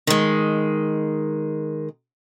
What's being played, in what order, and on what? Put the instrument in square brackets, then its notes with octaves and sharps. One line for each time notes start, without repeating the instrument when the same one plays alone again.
[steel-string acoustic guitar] D#3 G#3